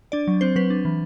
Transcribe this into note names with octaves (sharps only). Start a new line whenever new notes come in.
D4 D5
F#3
C4 C5
F#3 B4
D4
E3